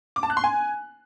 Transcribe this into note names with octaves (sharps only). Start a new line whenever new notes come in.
D6
A5
F#6
C6
G#5